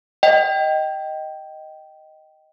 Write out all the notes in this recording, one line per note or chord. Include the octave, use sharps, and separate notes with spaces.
D#5 G5